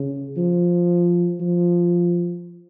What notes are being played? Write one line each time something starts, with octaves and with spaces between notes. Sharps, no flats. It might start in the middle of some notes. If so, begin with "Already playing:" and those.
Already playing: C#3
F3
F3